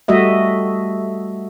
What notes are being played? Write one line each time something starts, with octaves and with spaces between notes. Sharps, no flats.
G3 A3 F#4 D#5 E5